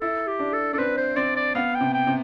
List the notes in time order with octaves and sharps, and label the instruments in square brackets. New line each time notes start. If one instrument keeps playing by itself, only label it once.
[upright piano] E4 [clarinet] A4
[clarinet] G4
[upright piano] D4
[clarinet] A4
[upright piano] D4 [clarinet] A4
[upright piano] C4 [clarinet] B4
[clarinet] C5
[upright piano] C4 [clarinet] D5
[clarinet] D5
[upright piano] B3 [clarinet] F5
[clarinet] G5
[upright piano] C3
[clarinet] G5
[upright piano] C3